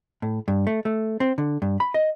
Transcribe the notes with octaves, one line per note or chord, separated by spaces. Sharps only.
A2
G2
A3
A3
C4
D3
G2
B5
D#5